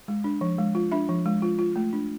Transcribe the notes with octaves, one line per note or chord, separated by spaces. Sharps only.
G#3
D4
F3
G#3
F4
D4 E5
F3
G#3
F4
F4
A3
D4